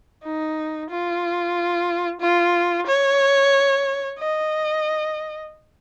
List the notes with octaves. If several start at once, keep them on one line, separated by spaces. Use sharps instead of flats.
D#4
F4
F4
C#5
D#5